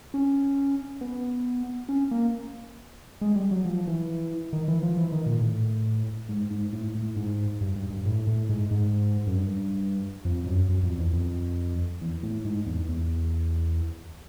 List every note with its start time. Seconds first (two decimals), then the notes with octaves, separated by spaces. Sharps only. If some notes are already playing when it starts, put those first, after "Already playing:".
0.14 C#4
1.01 B3
1.89 C#4
2.11 A#3
3.21 G#3
3.36 G3
3.51 F#3
3.65 F3
3.87 E3
4.53 D#3
4.68 E3
4.83 F3
4.97 E3
5.12 D#3
5.26 A#2
5.41 A2
6.29 G#2
6.51 G#2
6.73 A2
6.95 A2
7.16 G#2
7.61 G2
7.76 G2
7.90 G2
8.06 A2
8.27 A2
8.49 G#2
8.71 G#2
9.27 F#2
9.37 G2
10.25 F2
10.47 F#2
10.69 F#2
10.83 F2
10.98 E2
11.13 F2
12.01 E2
12.23 A2
12.45 G#2
12.67 E2
12.89 E2